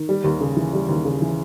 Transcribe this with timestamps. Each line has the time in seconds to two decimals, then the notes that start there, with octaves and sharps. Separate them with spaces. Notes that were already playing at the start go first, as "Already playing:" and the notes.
Already playing: D#3
0.09 G3
0.24 D#2
0.41 C#3
0.57 E3
0.73 G3
0.89 D#2
1.05 C#3
1.22 E3